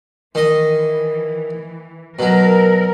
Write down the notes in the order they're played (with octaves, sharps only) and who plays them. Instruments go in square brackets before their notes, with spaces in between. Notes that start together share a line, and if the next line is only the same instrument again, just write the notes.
[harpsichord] D#3 D#5 [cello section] E3
[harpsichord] B2 F#3 [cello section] A#4